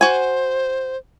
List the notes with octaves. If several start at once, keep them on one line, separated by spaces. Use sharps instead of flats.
F#4 C5 G#5